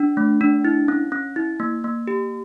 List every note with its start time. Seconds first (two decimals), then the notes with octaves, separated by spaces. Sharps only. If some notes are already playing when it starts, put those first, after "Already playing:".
Already playing: D4
0.17 A3
0.41 D4
0.65 E4
0.88 C#4
1.12 C#4
1.36 E4
1.60 A#3
1.84 A#3
2.07 G4